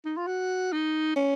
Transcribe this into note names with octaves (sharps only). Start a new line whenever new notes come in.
D#4
F4
F#4
D#4
C#4